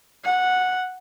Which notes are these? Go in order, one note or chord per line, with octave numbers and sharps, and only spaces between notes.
F#5